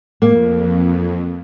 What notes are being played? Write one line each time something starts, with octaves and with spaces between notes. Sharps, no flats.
F2 A#3